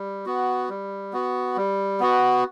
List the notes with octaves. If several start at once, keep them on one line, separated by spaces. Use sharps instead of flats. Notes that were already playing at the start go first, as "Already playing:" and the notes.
Already playing: G3
B3 F#4
G3
B3 F#4
G3
B3 F#4